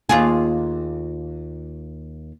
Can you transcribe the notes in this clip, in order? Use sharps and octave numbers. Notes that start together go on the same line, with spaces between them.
D#2 F4 G#4